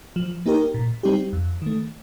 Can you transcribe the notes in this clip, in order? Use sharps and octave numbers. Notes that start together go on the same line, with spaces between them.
F3
A#3 D#4 G4 A#4
A#2
G3 C4 D#4 G4
F2
D#3 A3